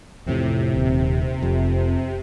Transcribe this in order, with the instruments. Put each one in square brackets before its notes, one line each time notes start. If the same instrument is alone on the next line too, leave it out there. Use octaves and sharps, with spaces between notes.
[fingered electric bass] A1 F2 A2 [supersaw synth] C3
[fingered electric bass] D#1 D#2
F1 F2